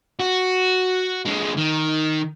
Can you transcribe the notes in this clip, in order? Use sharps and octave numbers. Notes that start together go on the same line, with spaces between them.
F#4
D3 G#3
D#3